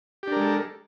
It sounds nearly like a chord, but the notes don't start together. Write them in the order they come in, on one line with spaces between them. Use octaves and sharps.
G4 D4 A#4 G#3 A4